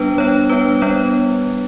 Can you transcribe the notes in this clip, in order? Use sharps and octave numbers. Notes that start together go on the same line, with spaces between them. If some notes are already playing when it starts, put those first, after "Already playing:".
Already playing: G3 B3 D4 B4
G3 B3 D4 C#5
G3 B3 D4 B4
G3 B3 D4 C#5